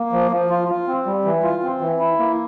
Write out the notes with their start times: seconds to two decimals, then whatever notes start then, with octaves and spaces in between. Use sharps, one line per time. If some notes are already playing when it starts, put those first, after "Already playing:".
Already playing: A#3
0.13 F3
0.31 F3
0.50 F4
0.68 F4
0.87 C4
1.06 G3
1.25 E3
1.43 F4
1.63 C4
1.81 E3
2.00 E4
2.19 A#3